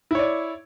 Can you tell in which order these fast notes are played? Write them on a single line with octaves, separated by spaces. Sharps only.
E4 C#5 D5